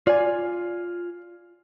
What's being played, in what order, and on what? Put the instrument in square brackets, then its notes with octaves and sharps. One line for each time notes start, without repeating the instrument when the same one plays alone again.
[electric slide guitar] F4 G#5 [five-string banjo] D5